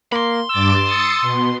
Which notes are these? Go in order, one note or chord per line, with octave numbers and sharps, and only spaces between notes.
A#3 B5 C6
G2 D6 E6 A6
D#6 A6 C#7
B2